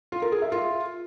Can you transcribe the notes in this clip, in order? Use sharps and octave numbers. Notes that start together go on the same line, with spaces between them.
F4
A#4
G#4
E5
F4